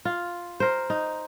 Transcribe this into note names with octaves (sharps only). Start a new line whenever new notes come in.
F4
A#4 C5
D#4